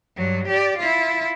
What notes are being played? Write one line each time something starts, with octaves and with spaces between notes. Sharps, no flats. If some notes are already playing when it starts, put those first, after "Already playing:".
G2 F#3
G4 D5
E4 F4